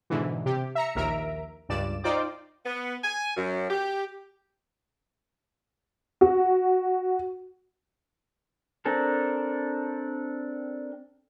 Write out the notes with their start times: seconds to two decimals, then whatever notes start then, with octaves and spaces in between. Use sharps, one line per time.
0.10 G#2 B2 D3 E3
0.46 C3 G4
0.75 E5 A#5 C#7
0.95 A#1 D#2 A#4 E5 A#5 D7
1.69 C#2 G2 D5 E7
2.04 D#4 F4 C5 D5 G5 D6
2.65 B3
3.03 G#5
3.36 F#2
3.69 G4
6.21 F#4
8.85 C4 D4 A4 A#4